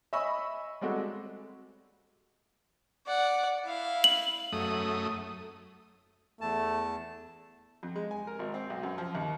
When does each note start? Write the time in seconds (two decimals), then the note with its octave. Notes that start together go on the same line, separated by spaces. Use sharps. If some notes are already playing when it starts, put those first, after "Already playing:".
0.13 D#5 E5 G#5 B5 C#6 E6
0.81 G3 G#3 C4 F#4 A4
3.06 D5 F#5
3.65 E4 F5
4.04 F#7
4.52 F#2 A3 D#6
6.41 E2 A3 A5
7.83 F2
7.96 G#3
8.11 G#5
8.27 A#4
8.39 G#1
8.54 C4
8.70 B1
8.83 F#2
8.98 F3
9.15 D#2